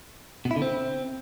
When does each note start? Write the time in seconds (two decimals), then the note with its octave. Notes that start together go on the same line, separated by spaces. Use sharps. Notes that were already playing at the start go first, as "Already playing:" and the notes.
0.45 B2
0.51 E4
0.56 D3
0.62 C4